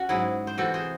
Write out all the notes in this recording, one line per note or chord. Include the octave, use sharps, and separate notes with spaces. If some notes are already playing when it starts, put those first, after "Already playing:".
Already playing: C#4 F#4
G#2 F#3 E4 G#4
C5
C3 E3 F#4 A4
G#4 C5